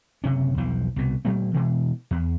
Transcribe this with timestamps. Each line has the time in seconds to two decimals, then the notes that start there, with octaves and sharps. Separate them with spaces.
0.24 F#1 C3 C#4
0.57 B1 E2 F3
0.96 C2 B2
1.25 A#2 F#3 A3 A#3
1.54 B2 E3 G#3
2.11 E2